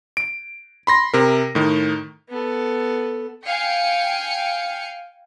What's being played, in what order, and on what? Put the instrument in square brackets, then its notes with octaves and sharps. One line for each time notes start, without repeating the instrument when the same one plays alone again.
[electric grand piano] D7
B5 C6 A#6
C3 A#4
A2 D#3
[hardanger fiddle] B3 A4
[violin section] F5 G5 G#5 C#7